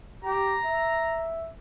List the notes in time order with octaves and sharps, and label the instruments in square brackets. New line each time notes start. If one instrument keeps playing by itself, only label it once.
[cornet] G4 [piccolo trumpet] A#5
[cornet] E5